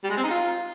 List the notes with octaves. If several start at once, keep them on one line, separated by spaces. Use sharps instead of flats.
G3
G#3
C4
D#4
F4